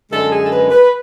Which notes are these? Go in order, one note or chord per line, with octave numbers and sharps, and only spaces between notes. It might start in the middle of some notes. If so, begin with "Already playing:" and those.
F#2 D3 G#3 A4
G#4
A4
B4
B4